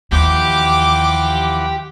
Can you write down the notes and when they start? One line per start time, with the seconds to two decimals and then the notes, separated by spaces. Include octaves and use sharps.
0.12 D#2 E3 F3 G4 F#5 D6